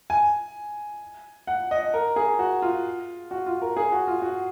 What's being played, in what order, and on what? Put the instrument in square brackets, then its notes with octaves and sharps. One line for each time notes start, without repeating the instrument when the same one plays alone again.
[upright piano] G#5
F#5
D#5
A#4
G#4
F#4
F4
F#4
F4
A#4
G#4
F#4
F4
F#4